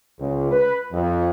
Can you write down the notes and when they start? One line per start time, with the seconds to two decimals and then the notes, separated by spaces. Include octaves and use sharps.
0.19 C#2
0.51 B4
0.92 F2